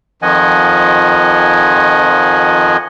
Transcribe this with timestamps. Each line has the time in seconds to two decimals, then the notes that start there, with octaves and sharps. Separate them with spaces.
0.22 F2 D#3 F3 D#5 F#5 G#5